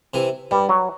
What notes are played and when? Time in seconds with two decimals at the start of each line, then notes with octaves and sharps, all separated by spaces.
0.14 C3 E3
0.51 G2 G3
0.69 F#3